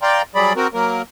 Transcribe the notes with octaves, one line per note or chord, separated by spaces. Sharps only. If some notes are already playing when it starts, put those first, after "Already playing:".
D5 F5 G5 A#5 C6
F#3 G3 G#4 D5 B5
C4 F#4 A#4
F#3 A#3 A#4